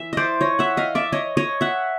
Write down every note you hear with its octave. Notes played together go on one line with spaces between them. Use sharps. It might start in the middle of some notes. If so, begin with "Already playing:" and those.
Already playing: E3 E5
C5 D5 D#5
C#5 D#5
E5 F#5
D#5 F5
D5 E5
C#5 D#5
C#5 D#5
E5 F#5